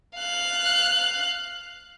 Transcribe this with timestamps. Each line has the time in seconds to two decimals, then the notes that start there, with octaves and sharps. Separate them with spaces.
0.18 F5 F#6